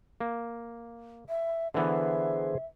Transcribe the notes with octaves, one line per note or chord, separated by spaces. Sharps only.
A#3
E5
D3 E3 B3 G#4 C5 E5